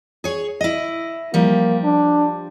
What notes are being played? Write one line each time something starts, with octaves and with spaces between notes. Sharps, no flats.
G#4 C#5
E4 D#5
F3 G3 A#3
D4